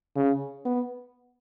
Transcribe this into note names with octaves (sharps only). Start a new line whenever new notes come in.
C#3
B3